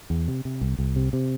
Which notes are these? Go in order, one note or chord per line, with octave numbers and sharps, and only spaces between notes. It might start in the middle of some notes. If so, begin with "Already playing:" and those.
E2
C3
C3
C2
C2
C3
C3